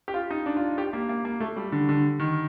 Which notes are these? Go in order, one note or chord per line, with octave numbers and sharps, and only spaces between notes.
G4
F4
D#4
D4
F4
G4
A#3
A#3
A#3
A3
G3
D3
D3
D#3